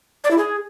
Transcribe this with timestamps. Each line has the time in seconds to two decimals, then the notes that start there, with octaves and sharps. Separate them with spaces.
0.24 D5
0.31 E4
0.38 G#4